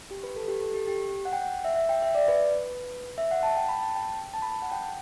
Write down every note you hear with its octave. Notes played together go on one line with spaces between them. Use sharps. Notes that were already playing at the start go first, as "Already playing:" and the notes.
G4
B4
A4
G4
A4
G4
G4
F#5
G5
F#5
E5
E5
G5
E5
D5
B4
E5
F#5
A5
G5
B5
A5
G5
A5
B5
A5
F#5
G5